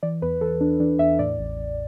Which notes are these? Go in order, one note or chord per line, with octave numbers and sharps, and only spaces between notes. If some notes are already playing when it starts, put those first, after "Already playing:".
E3 D5
E2 B4
E3 A4
E2 D4
E3 D4
E2 E5
A2 D5
A1
A1